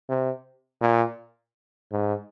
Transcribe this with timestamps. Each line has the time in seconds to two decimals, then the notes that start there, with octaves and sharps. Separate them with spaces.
0.09 C3
0.81 A#2
1.92 G#2